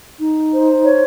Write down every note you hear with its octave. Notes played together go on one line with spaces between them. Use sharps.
D#4
C5
C#5